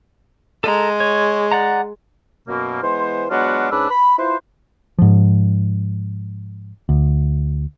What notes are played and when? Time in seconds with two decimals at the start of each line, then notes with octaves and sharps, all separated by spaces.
0.64 G#3 A4 A#5
1.00 C#5
1.51 D5 F#5 A#5
2.48 F#2 B2 A#3
2.82 E3 G#3 B3 C5
3.30 F#3 G#3 B3 D4 F4 F#4
3.71 G#2 C#4 D4 B4 D6 E6
3.89 B5
4.19 E4 F4 B4 C5
4.99 G#2 F3
6.89 D2